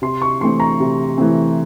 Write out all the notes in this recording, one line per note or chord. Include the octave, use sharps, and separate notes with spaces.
C3 C6
C#6
E3 A3 C4 C6
A#5
C3
E3 A3 C4